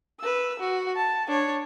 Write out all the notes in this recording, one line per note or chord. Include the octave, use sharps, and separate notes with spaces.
B4 E6
F#4
A5
D4 C#5